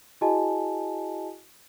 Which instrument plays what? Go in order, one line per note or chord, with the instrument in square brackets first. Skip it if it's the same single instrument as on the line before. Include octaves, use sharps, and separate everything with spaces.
[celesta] E4 F#4 G#4 D#5 G#5 A5